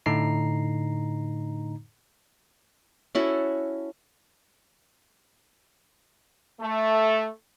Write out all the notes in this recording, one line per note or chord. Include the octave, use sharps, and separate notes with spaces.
A2 D3 D#4 A#5 C7
C#4 E4 F#4 A4
A3